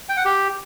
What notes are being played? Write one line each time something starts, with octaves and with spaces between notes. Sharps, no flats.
G5
F#5
G4